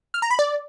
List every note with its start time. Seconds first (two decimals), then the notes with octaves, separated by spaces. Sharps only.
0.14 F6
0.22 A#5
0.31 B5
0.39 D5